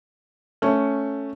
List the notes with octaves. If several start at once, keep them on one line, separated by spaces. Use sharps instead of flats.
A3 C#4